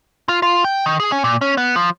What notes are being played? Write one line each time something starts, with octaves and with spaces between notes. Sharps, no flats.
F4
F4
G5
D#3
G#4
C#4
A#2
C#4
B3
F3